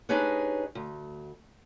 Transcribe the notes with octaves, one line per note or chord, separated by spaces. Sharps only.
D4 D#4 G4 G#4 B4 C#5
D2